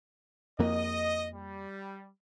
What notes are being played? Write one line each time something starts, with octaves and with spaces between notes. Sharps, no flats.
F2 A#3 D#5
G3